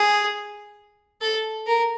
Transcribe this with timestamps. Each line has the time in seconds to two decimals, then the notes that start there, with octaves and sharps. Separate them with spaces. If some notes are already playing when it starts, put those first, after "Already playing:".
Already playing: G#4
1.21 A4
1.67 A#4